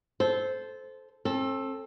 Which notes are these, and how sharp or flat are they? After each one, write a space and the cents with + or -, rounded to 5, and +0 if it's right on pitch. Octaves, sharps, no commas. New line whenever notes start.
A4 -20 C5 -5
C4 +40 A4 +0